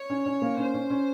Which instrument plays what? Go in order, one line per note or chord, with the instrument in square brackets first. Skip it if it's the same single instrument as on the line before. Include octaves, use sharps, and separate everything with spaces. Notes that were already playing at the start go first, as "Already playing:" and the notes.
Already playing: [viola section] C#5
[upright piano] C#4
C#4
A#3
[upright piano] C#4 [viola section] C5
[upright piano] C#4
C#4